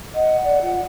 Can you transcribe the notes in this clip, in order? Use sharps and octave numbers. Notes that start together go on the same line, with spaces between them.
D#5 F#5
D5
F4